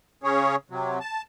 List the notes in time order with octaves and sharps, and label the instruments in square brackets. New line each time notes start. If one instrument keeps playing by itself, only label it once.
[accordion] C#3 C#4 G#4 C#5
C3 F#3
A5